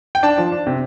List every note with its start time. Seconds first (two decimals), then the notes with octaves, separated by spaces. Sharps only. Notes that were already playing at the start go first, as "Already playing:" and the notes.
0.15 G5
0.23 D4 A5
0.38 F3
0.52 D4
0.67 C3